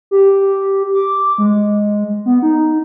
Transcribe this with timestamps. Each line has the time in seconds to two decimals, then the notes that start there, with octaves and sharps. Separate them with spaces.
0.11 G4
0.94 D6
1.38 G#3
2.26 B3
2.42 D#4